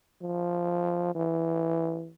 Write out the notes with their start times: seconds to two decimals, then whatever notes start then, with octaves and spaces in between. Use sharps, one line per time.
0.21 F3
1.15 E3